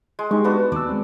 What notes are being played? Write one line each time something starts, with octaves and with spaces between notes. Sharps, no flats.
G#3
G#3 D#4 G4 C#6
B3 D4 F#4
D#2 D5 E6
G#3 C4